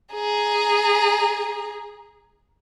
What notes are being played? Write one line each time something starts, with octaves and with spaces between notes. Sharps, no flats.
G#4 A#5